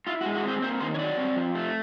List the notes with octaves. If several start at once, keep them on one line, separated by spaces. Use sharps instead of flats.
E4 F4
F#4
G#3
F#4
C4 C5
A#3 C5
D#3 C5
C#5
F#3 D5
C4
F3
A3